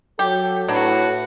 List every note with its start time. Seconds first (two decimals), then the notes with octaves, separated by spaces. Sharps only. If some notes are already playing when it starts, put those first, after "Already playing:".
0.19 F#3 G4 A4
0.68 A2 F#3 D4 F#4 B4